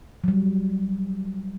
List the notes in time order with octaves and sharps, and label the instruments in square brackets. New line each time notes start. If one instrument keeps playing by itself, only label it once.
[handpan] F#3 G3